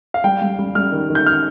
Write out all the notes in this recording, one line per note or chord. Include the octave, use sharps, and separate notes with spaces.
F5
G3 G5
G3
G3
G3 F6
D#3
D#3
G6
F6